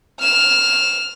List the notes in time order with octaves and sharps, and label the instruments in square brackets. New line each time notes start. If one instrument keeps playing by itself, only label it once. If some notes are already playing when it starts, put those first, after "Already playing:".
[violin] F6 E7